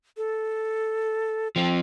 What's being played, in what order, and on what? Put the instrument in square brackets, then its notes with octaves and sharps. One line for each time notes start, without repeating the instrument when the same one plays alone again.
[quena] A4
[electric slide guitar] F3 C4 [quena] G5